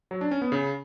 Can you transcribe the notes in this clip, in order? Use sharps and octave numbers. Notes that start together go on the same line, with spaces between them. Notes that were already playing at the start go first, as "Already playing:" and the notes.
F#3
D4
C#4
B3
C#3